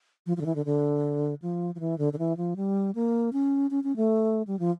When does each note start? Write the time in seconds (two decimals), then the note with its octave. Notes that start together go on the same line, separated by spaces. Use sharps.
0.26 F3
0.37 F3
0.41 D3
0.46 E3
0.56 D3
0.66 D3
1.42 F3
1.75 F3
1.80 E3
1.98 D3
2.13 D3
2.19 E3
2.37 F3
2.56 G3
2.95 A#3
3.33 C#4
3.71 C#4
3.84 C#4
3.96 A3
4.47 G3
4.59 F3